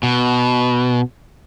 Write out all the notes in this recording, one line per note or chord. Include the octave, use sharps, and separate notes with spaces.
B2